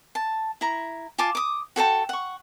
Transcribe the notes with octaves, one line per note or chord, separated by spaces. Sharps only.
A5
E4 A#5
F4 G#5 A5 D6
D6 D#6
F#4 A4 G5 A5
F#5 C#6